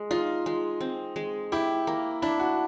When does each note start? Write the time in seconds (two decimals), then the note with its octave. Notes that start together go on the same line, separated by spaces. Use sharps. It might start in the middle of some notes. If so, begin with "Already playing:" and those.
Already playing: G#3
0.11 D#4 F4
0.46 G#3
0.80 C4
1.16 G#3
1.52 E4 G4
1.87 A#3
2.22 D4 E4
2.40 F#4